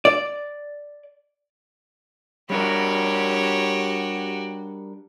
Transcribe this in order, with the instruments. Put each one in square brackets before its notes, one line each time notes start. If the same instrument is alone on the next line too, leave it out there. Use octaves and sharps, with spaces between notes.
[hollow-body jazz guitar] D5
[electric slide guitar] G3 D4 A#4 [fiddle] F#4 G4 [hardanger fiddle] C#5